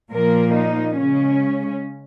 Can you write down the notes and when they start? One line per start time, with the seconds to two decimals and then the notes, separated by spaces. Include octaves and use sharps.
0.10 A#2 F3 A#3 A#4
0.54 D#4
0.97 C#3 G#3 C#4